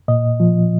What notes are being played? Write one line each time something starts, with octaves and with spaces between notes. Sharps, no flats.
A#2 D#5
F3